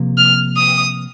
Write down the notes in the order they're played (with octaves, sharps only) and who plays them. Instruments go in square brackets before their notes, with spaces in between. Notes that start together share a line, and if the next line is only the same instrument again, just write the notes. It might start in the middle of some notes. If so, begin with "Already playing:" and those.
Already playing: [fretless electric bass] C3 F3 A#3
[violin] F6
D#6